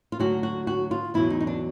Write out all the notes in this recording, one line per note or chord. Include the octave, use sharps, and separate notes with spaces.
F4
D2 D3 F#3 F#4
F#4
F#4
F4
E2 B2 F#3 E4
D#4
D#4
D4